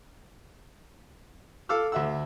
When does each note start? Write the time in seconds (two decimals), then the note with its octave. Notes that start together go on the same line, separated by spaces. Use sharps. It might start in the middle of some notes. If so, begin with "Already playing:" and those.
1.69 A4 F5 D6 E6 F6
1.92 D2 E5 F#5 E6